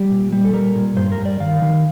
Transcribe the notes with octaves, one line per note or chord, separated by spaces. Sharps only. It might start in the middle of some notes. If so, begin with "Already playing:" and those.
Already playing: G3 G4
A#2
G3
A4
G3 A#4
A#2
G2 C5
A#4
G2
D5
D#3 F5
D#3